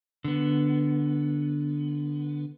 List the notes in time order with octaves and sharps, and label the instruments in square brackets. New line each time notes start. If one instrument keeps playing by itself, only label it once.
[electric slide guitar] D3 B3